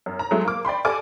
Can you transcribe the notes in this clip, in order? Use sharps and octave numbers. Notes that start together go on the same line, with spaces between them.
F#2
A#5
F#3 G#3 A3
A#3 D6
D5 G5 B5 C6
G4 A4 D5 G#5 D6